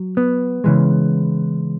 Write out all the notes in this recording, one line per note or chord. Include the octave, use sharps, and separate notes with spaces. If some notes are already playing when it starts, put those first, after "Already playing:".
Already playing: F#3
B3
C#3 E3 G#3